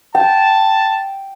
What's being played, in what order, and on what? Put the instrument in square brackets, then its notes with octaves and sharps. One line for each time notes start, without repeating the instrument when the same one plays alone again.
[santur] G5 [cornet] A5